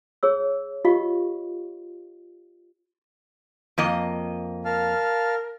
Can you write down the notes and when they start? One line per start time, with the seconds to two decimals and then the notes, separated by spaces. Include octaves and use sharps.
0.23 G#4 C#5 E6
0.85 F4 G4 D#5 F5 C#6
3.78 F2 A#3 D#5
4.65 A#4 F5 A5 F6